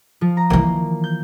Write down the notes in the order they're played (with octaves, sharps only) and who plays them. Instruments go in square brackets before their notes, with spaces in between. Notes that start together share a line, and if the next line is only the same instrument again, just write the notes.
[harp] F3
A#5
[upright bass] D#3 E3 [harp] A#3
[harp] G6